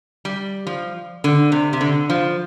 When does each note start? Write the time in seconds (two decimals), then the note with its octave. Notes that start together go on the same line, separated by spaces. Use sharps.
0.25 G3
0.67 F3
1.24 D3
1.52 C3
1.73 C3
1.81 D3
2.10 F3